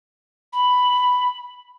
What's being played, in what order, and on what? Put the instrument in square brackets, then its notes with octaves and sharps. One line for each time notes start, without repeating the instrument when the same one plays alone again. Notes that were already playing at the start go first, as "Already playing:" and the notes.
[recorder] B5